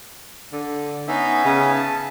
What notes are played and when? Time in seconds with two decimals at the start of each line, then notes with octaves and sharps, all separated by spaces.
0.53 D3
1.08 B3 C#4 D#4 E5
1.45 C#3
1.75 A5